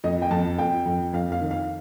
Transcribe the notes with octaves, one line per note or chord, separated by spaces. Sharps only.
F2 D#5
G5
F2 A5
F2 G5
F2
F2 F5
F5
D#3
F5